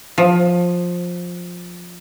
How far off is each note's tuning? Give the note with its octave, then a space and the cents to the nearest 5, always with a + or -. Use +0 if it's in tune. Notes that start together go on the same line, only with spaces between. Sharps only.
F3 +15